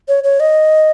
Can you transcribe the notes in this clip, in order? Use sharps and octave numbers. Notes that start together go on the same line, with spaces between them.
C#5
C#5
D#5